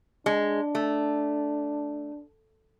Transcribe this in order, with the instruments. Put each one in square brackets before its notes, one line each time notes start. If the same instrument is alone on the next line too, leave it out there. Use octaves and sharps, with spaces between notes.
[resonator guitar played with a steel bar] G#3 [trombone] D4
[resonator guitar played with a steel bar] A3